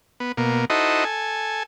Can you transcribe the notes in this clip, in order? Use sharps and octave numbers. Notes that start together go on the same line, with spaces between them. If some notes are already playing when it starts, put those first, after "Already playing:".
B3
B2 A#3
D#4 E4 F#4 A4 C5 D#5
A4 G#5